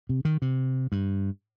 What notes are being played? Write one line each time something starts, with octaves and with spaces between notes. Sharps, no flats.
C3
D#3
C3
G2